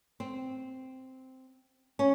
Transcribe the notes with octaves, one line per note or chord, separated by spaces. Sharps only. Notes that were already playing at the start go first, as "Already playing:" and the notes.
C4
C#4